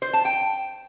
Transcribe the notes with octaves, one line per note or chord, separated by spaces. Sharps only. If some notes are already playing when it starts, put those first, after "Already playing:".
C5
A5
G5